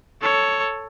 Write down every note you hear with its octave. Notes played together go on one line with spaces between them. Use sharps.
A4 C#5